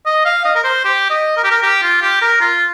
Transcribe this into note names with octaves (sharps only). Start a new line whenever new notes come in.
D#5
F5
D#5
A#4
C5
G4
D#5
A#4
G4
A#4
G4
F4
G4
A#4
F4